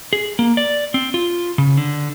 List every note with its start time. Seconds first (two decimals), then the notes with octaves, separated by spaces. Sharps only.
0.13 G#4
0.39 A#3
0.57 D5
0.94 C4
1.14 F4
1.58 C#3
1.77 D3